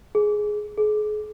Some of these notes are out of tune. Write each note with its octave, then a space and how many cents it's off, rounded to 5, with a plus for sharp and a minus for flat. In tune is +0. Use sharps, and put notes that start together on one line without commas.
G#4 +10
G#4 +35